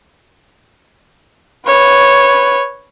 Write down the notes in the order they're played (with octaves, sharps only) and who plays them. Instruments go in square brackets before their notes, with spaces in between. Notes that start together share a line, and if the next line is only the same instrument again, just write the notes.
[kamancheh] B4 C#5